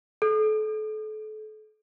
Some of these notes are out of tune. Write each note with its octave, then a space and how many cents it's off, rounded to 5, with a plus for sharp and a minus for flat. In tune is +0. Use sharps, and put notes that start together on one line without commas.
A4 -35